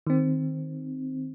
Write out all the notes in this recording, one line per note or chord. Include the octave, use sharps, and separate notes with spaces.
D#3 C4